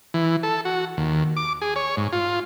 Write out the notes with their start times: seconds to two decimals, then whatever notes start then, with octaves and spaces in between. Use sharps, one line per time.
0.14 E3
0.43 A4
0.65 F#4
0.97 D#2
1.37 D6
1.62 G#4
1.76 C#5
1.97 G#2
2.13 F4